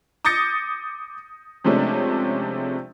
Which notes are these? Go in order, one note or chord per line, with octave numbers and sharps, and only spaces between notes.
D6 D#6 G6 A6 A#6 C#7
C3 F3 G#3 A3 C#4 D4